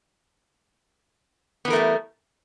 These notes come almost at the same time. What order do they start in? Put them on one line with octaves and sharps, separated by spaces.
B3 E3 A#4 A3 G3